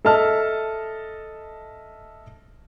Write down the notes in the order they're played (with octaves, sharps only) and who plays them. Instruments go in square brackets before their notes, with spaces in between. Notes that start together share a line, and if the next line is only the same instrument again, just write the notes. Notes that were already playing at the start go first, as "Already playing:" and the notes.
[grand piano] A4 D#5 E5 A5 F6